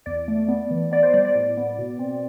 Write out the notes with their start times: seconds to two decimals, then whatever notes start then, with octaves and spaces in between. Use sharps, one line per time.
0.06 E2 D5
0.28 A3
0.48 B3
0.71 E3
0.92 B3 D5
1.03 C5
1.14 G3 D5
1.25 D5
1.35 A2
1.57 B3
1.78 B2
1.99 C4